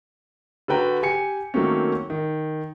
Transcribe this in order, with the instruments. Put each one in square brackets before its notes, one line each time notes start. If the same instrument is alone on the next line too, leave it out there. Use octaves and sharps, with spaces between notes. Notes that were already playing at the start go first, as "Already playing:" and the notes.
[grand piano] D3 F#4 B4 G5 A#5
G4 G#5 C#7
D#3 F#3 A3 A#3 C4 C#4
D#3